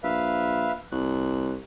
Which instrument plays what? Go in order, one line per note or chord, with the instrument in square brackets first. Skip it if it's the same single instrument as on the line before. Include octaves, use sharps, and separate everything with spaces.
[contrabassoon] A#1 [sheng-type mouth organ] B4 E5 F5
[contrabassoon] C2 [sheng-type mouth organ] F#6